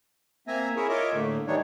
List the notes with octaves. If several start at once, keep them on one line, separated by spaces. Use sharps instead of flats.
A#3 C4 E5 G#5 A#5
E4 G#4 A#4 C#5 E5
F4 A#4 C#5 D#5 E5 D6
A2 D3 A3 A#3
D#3 E3 G3 D4 D#4 C#5